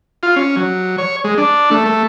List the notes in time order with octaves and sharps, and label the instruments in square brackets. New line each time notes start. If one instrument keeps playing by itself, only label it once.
[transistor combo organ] F4
C#4
F#3
C#5
G#3
D4
A3
A3